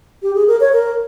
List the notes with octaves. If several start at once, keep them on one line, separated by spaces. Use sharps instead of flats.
G4
G#4
A#4
C#5
A#4